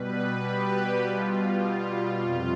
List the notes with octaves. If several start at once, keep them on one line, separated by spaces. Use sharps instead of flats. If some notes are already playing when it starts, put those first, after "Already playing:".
Already playing: B2 G3 B4
G4
B2 G3 F4
F2 C3 F4